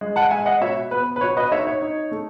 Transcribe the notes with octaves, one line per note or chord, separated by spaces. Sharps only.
G#3
F#5 A5
G#3 E5 G#5
D#5 F#5
B2 C#5 E5
B3 B4
B4
B2 C#5
B4 D#5
D#4 C#5 E5
C#5
D#4
A3